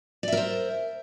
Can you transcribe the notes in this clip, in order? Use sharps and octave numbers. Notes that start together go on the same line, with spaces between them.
A#4 C5 D5 E5